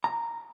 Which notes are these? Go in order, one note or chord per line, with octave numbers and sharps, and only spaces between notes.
A#5